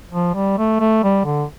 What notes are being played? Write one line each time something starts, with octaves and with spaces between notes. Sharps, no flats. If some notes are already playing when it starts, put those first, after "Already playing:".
F3
G3
A3
A3
G3
D3